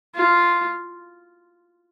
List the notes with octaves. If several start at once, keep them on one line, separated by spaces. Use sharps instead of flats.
F4